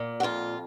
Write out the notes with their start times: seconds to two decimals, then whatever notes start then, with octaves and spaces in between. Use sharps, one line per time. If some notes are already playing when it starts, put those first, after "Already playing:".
Already playing: A#2
0.20 F#4
0.23 F2 F4